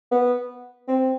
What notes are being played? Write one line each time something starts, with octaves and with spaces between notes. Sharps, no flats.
B3
C4